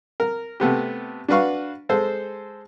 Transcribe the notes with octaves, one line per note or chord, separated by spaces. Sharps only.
A#4
C3 A3 B3 G4
D4 F#4 B4 F5 C#6
G#3 A4 C5